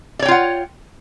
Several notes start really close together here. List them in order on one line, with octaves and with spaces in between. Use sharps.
D5 C#5 G5 F4 F#5